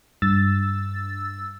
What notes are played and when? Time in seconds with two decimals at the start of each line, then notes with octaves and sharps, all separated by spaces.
0.22 G2 E6 A6